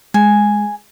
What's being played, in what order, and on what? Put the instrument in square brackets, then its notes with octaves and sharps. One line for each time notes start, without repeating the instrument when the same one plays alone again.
[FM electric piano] G#3 [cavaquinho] G#5